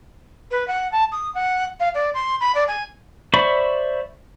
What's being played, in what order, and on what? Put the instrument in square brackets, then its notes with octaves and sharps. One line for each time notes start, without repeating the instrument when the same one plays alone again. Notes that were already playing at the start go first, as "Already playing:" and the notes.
[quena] B4
F#5
A5
D#6
F#5
F5
D5
C6
B5
D5
G#5
[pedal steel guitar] C5 D5 E5 B5 C#6